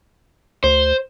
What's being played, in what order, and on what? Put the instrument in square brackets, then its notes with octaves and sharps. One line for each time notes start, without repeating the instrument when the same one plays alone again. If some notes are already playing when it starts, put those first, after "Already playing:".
[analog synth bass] D2 [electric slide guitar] C5